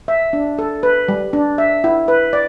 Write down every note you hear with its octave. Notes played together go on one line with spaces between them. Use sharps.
E5
D4
A4
B4
G3
D4
E5
E4
B4
D5